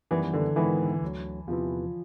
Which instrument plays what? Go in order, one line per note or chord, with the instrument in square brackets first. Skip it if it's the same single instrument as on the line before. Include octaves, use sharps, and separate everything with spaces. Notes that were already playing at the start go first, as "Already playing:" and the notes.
[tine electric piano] F#2 D#3 G3 B3 [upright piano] E3
[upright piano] D3
[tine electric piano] G#2 D#3 G#3 B3 E4 [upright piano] E3
[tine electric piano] D2 D3 F#3
[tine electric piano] E2 C3 E3 [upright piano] F3